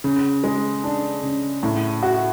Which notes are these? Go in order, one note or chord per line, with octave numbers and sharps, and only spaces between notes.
C#3
G#3
D4
C#3
A2
F#4